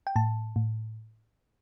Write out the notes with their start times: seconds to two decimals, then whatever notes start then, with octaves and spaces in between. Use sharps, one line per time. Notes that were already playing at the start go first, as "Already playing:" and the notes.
0.07 G5
0.16 A2 A5
0.56 A2